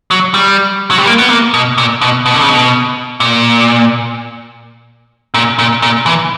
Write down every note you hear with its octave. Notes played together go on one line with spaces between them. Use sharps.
F#3
G3
F#3
G3
A#3
B3
A#3
B2
A#2
B2
B2
D3
C#3
B2
A#2
A#2
A#2
A#2
E3